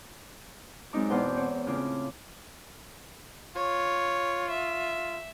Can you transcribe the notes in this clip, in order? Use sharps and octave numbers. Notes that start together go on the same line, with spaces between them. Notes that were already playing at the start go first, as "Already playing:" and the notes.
F#2 G#3 C4 D#4 D6
E2 B2 C5 G5
C4 C#5
A2 C#3 F4 D6
F4 C#5
E5